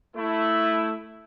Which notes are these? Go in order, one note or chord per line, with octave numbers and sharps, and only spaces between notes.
A3 E4